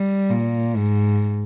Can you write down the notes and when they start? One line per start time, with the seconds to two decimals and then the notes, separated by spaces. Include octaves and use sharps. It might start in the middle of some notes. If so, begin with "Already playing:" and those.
Already playing: G3
0.30 A#2
0.76 G#2